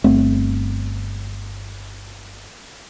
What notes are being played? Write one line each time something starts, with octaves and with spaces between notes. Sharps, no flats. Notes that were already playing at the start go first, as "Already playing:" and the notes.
G1 A3 C4